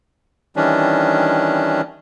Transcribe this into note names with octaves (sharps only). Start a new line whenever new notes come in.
D#3 E3 G3 C#4 D4